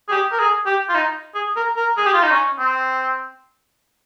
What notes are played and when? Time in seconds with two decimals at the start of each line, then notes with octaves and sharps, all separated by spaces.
0.08 G#4
0.12 G4
0.32 A#4
0.39 G#4
0.66 G4
0.89 F4
0.95 D#4
1.35 G#4
1.57 A#4
1.77 A#4
1.97 G#4
2.06 G4
2.13 F4
2.23 D#4
2.31 C#4
2.59 C4